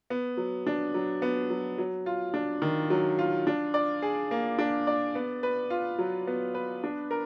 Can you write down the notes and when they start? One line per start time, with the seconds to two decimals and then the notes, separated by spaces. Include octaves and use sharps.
0.10 B3
0.37 F#3
0.67 D4
0.94 F#3
1.22 B3
1.50 F#3
1.78 F#3
2.06 F4
2.34 D4
2.62 D#3
2.90 F#3
3.19 F4
3.47 D4
3.74 D5
4.02 G#4
4.31 A#3
4.59 D4
4.87 D5
5.15 B3
5.43 B4
5.70 F4
5.98 F#3
6.27 B3
6.54 B4
6.84 D4
7.11 A#4